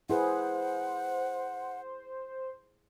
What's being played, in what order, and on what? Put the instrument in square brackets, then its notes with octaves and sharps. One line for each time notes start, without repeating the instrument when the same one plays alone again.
[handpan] E4 G#4 B4 [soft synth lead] C5 [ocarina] F#5